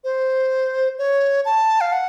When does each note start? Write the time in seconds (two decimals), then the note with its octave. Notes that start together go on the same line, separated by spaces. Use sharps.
0.04 C5
0.99 C#5
1.45 A5
1.81 F5
1.92 F#5